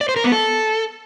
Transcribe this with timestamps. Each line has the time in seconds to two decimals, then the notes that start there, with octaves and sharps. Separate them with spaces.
0.01 D5
0.09 C5
0.16 A#4
0.24 B3
0.32 A4